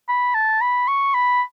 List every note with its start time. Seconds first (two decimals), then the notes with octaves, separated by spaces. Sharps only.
0.09 B5
0.35 A5
0.61 B5
0.88 C#6
1.14 B5